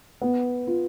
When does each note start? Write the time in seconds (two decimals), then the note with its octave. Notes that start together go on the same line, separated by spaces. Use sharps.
0.21 B3
0.67 F4